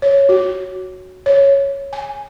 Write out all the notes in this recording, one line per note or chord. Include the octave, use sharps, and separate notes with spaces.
C#5
F#4
C#5
G#5